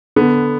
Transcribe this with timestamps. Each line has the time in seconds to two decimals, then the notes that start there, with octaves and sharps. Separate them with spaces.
0.16 D3 B3